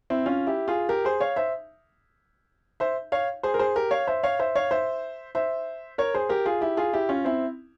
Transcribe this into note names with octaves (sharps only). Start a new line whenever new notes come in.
C4 E4
C#4 F4
E4 G4
F4 G#4
G4 A#4
G#4 C5
C#5 F5
C5 E5
C5 E5
C#5 F5
G#4 C5
A#4
G#4 C5
G4 A#4
C#5 F5
C5 E5
C#5 F5
C5 E5
C#5 F5
C5 E5
C5 E5
A#4 C#5
G#4 C5
G4 A#4
F4 G#4
E4 G4
F4 G#4
E4 G4
C#4 F4
C4 E4